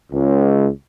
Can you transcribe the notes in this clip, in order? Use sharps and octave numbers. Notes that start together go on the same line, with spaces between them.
C#2